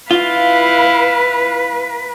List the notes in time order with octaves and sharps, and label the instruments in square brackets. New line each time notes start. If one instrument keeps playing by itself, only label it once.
[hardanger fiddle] E4 F5 [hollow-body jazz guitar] F4 [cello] B4